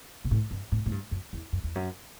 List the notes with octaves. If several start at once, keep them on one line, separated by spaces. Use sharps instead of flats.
B2
A2
G2
A2
A2
G2
F#2
E2
F#2
E2
F#2